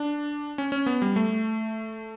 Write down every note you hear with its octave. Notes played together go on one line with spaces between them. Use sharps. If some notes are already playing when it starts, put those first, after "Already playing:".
Already playing: D4
C#4
C#4
B3
G3
A3